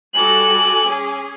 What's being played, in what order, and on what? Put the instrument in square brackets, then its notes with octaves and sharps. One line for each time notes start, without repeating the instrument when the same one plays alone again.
[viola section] G3 F#4 A4 [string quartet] G#5 D6 [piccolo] F#7
[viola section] C#4 G#4